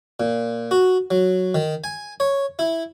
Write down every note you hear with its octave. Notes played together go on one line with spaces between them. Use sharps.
A#2
F#4
F#3
D#3
G#5
C#5
E4